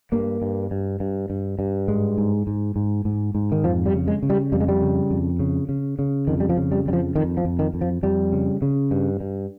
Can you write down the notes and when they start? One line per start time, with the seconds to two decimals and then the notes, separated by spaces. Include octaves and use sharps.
0.12 G2 A#3
0.42 G2
0.71 G2
1.00 G2
1.30 G2
1.59 G2
1.88 G#2 G#3
2.18 G#2
2.47 G#2
2.76 G#2
3.05 G#2
3.35 G#2
3.52 D#3
3.64 F2 F3
3.86 G3
3.93 C#3
4.08 G#3
4.23 C#3
4.30 G3
4.52 F2 G3
4.60 G#3
4.68 G3
4.81 C#3
5.11 F2
5.40 C#3
5.69 C#3
5.99 C#3
6.27 F2 D#3
6.40 G3
6.49 F3
6.57 C#3
6.72 G3
6.86 F2 G3
6.93 F3
7.16 F2 D#3
7.37 F3
7.45 F2
7.59 D#3
7.74 F2
7.81 F3
8.03 F2 G3
8.33 C#3
8.62 C#3
8.91 G2
9.20 G2